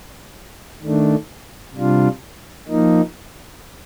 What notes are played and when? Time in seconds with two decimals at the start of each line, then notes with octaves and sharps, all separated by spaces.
0.83 D#3 A3 D4
1.75 C3 G3 D4 F4
2.68 F3 A#3 D#4